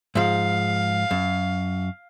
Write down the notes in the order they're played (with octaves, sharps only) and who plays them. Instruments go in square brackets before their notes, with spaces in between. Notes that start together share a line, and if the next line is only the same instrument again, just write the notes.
[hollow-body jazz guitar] G#2 F3 [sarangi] F5
[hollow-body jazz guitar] F#2